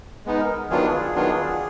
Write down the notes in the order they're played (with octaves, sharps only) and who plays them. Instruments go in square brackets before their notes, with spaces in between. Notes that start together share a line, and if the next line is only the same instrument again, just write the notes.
[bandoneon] G#3 B3 D#4
[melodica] A#4
[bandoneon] D#3 F#3 B3 D4 F4 [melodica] G#4
[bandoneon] D#3 F#3 B3 D4 F4